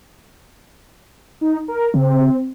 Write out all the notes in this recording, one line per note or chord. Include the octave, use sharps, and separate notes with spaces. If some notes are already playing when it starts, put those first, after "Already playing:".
D#4
A#4
C#3 C4